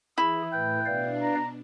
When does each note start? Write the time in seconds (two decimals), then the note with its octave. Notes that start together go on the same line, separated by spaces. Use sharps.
0.18 E3 E4 G#4
0.53 A2 B4 G5
0.86 B2 D4 B4 D5 F5
1.22 A#5